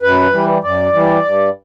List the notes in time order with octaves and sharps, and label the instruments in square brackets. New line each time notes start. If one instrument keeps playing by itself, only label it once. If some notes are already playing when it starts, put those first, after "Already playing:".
[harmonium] F#2 B4
E3 G3
F#2 D5
E3 G3
G2